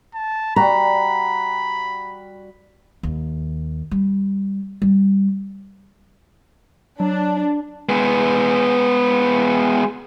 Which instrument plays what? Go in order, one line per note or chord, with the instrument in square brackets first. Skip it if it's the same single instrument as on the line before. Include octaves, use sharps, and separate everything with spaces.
[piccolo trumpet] A5
[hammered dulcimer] G3 F#4 [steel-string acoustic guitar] A#5 [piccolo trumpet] B5
[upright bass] D#2
G3
G3
[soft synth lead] F#3 [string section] D4
[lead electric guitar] G#3 B3